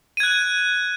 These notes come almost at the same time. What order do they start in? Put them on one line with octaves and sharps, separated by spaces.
D#7 G#6 F#6